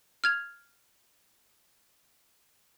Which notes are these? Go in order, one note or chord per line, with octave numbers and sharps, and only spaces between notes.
F6 G#6 F7